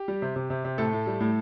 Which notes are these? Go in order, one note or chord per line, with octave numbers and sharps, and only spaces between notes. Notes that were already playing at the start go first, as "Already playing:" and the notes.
Already playing: G4
G3
C3
C3
C3
C3
A2 A3 A4
A2
G3
A2